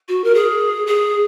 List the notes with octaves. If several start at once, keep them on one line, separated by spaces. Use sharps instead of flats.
F#4
A#4
G#4
G#4